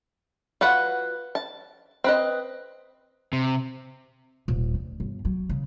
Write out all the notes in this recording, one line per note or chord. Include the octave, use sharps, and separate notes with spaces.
F4 F#4 B4 F#5
A5
C4 B4 D#5
C3
D#1
D2
G1
F#3
C#3